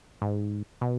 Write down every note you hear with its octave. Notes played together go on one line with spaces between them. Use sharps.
G#2
B2